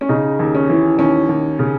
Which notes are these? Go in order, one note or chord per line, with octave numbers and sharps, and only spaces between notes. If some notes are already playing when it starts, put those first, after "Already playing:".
C#4
C#3 D#4
D#2
C#4
E3
D#2 C#4
D#2
C#3